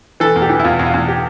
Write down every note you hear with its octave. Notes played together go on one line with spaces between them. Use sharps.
E3 A4
E2
G4
E3
E4
E2 F4
E2
F4
E2
G4